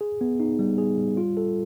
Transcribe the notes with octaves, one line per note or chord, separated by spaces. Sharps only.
G#4
B3
D#4
G3
G#4
G3
F4
A4